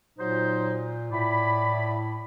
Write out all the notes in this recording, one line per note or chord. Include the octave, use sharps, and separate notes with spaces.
A#2 F#3 D#4 C5
A2 E4 D5 B5